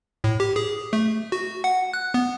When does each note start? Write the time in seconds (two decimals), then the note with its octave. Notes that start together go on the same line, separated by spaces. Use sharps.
0.24 A2
0.40 G4
0.56 G#4
0.93 A3
1.32 F#4
1.64 F#5
1.94 F#6
2.14 B3